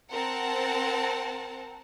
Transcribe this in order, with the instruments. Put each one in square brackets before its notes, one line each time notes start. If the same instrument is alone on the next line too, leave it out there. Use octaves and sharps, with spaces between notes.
[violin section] C4 A#4 F#5 A5